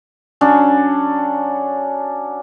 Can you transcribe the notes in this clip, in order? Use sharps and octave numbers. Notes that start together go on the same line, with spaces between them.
F#3 C#4 D4